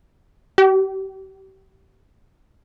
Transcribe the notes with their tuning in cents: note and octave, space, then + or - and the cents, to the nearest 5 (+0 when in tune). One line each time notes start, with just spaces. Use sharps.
G4 -35